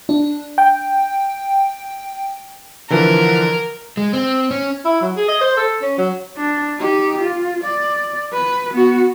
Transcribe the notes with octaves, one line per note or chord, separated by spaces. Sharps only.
D4
G5
D3 E3 F3 A#4
G#3
C4
C#4
E4
F#3
G#4
D#5
C5
A4
C#4
F#3
D4
D#4 G4
F4
D5
B4
B3 F#4